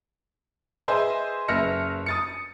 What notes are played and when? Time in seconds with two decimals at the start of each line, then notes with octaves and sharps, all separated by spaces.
0.88 G#4 B4 C5 D#5 E5 G#5
1.48 F#1 B4 E5 F6 A#6 C#7
2.06 D#6 A6 C#7